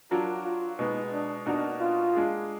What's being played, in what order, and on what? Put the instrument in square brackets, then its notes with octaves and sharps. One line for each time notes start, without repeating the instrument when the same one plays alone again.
[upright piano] F#3 D4 F#4 A#4 [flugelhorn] F4
[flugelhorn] F4
[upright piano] B2 G#3 B3 [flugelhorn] D#4
[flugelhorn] D4
[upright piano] B2 A#3 D#4 F#4 A#4 [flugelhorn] D4
[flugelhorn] F4
[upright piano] G#3 D4 G#4